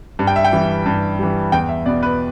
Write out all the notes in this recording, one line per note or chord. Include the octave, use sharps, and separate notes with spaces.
G2
G5
E5
G5
E3 G3
G2
E3 G3
E2 G5
E5
B2 B3 D5
B4